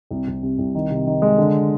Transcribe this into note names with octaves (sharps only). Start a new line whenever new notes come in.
C2
C2
C3
C2
D#3
C3
D#3
G#3
D3